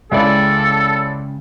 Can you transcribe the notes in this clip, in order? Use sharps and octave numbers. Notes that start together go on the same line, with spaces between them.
C#2 C#3 G#3 E4 A4 D5 G5